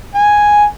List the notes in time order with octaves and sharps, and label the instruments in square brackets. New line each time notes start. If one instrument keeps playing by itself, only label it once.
[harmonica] G#5